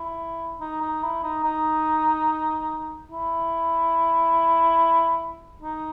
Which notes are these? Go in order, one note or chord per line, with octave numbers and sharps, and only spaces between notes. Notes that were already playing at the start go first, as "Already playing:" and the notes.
Already playing: E4
D#4
D#4
E4
D#4
D#4
E4
D#4